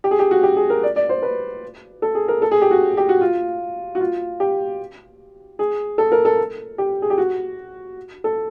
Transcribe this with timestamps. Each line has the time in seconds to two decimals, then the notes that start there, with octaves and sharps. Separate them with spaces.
0.04 G4
0.11 G#4
0.19 G4
0.31 F#4
0.43 G4
0.56 G#4
0.70 A#4
0.83 D5
0.96 D5
1.09 C5
1.23 B4
2.02 A4
2.15 G#4
2.28 A#4
2.42 A4
2.51 G#4
2.61 G4
2.71 F#4
2.97 G4
3.09 F#4
3.21 F4
3.95 F#4
4.00 F4
4.40 G4
5.59 G#4
5.98 A4
6.12 A#4
6.25 A4
6.78 G4
7.02 G#4
7.10 G4
7.18 F#4
8.24 A4